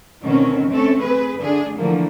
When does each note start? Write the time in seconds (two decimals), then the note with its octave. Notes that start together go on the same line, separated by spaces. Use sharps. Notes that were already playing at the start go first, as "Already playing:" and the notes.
0.23 D2 B2 D#3 C4 C#4
0.69 A3 C4 C#4 A4
1.01 C4 G#4 B4
1.41 D3 A3 D4 G#4
1.77 D3 E3 F3 A3 A#3